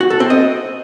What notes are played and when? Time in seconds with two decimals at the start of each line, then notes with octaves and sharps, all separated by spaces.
0.01 F#4
0.10 A4
0.20 C4
0.30 D#5